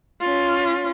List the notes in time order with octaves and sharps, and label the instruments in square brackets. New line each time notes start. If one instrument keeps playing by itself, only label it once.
[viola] C#4 F4